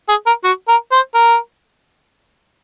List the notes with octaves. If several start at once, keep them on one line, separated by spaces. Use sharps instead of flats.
G#4
A#4
F#4
A#4
C5
A#4